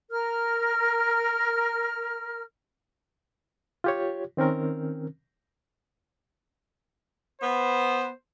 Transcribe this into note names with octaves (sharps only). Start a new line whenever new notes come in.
A#4 F6
F4 G4 C#5
D#3 C4 C#4 A#4
B3 C5